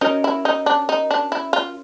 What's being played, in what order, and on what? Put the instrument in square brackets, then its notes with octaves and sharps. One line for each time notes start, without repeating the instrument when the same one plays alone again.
[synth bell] C#4 F#4 A#4 C#5 [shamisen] D#4
[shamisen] E4
D#4
D4
D#4
D4
E4
F4